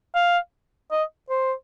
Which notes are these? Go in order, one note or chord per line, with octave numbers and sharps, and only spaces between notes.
F5
D#5
C5